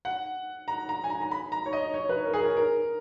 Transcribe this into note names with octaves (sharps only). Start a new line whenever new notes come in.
F#5
A#5
A#5
G#5
A#5
A#5
B5
A#5
C#5
D#5
C#5
B4
A#4
G#4
A#4
A#4